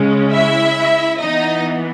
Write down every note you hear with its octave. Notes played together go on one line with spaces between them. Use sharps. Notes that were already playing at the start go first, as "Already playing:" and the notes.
Already playing: C#3 G#3 C#4
E4 E5
E3 B3 D#4 D#5